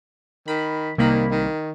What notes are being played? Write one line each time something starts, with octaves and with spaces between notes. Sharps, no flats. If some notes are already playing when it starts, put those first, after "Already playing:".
D#3 B5
C2 D#3 A#3 B5
D#3